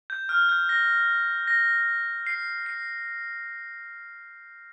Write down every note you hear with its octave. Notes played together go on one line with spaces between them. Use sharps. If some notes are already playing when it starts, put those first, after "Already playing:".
G6
F6
G6
A#6
A#6
C7
C7